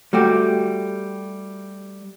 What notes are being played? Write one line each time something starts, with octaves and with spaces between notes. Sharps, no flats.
G3 A3 F#4 G4